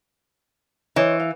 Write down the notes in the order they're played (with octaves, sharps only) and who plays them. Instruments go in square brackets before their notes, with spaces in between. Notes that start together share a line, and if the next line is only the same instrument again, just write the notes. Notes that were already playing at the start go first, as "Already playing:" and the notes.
[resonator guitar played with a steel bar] E3 [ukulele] C5 C#5 D#5
[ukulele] F5